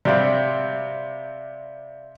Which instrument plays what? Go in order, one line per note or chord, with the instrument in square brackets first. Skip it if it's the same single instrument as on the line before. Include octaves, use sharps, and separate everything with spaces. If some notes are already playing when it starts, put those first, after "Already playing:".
[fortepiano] C3 G3 C4 [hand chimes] D5 E5 F5